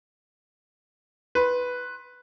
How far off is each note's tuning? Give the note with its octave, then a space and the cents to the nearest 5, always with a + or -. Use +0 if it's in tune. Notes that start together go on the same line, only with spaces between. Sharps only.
B4 +0 C6 +20